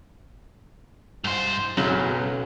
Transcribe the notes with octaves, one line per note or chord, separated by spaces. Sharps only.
G2 C5
B1 F#2 C#3 F#3